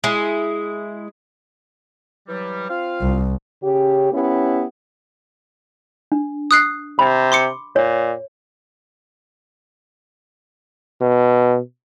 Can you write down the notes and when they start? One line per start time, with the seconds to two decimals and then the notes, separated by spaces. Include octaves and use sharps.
0.04 G#3 E4
2.29 E3 F#3 G3
2.70 C4 F4 F5
3.02 C2
3.63 C#3 C#4 G4
4.13 B3 C#4 E4 G4
6.12 D4
6.51 D#6 F#6 C7
6.99 C3 B5
7.32 C6 D6 C#7
7.76 A#2 C#5
11.01 B2